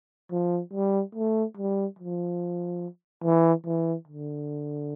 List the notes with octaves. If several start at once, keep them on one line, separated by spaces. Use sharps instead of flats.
F3
G3
A3
G3
F3
E3
E3
D3